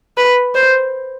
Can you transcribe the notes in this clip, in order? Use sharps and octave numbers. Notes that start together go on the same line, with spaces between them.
B4
C5